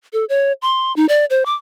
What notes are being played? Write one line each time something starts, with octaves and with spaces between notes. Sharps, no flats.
A4
C#5
C6
D#4
D5
C5
D6